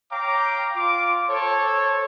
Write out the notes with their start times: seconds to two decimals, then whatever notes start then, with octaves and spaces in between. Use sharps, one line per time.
0.12 C#5 F5 G5 A#5 D6
0.76 F4 D6
1.29 A4 C5 C#5